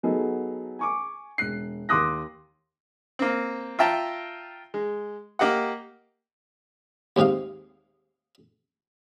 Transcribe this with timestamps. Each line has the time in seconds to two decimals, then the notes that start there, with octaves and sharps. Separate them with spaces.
0.03 F#3 B3 D#4 G#4 A4
0.79 G#5 C#6 D6
1.38 E1 F#6 C7
1.89 D#2 C6 D6 D#6 F#6 A#6
3.19 A#3 C4
3.79 F4 E5 G5 A5 A#5
4.74 G#3
5.39 A#3 G4 D#5 F#5
7.16 D#2 G#2 C3 D#4 F5